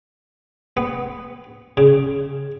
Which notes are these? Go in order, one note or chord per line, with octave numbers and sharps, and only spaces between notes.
B3
C#3